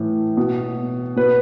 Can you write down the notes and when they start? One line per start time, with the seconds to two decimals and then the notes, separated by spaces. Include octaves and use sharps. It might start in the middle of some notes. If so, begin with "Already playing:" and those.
Already playing: A2 E3
0.37 B2
1.16 B2 B4